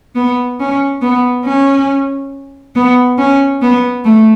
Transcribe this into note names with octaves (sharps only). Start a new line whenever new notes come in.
B3
C#4
B3
C#4
B3
C#4
B3
A3